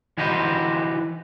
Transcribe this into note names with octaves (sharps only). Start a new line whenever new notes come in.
E3 D#4 F#4 G4 B4 C5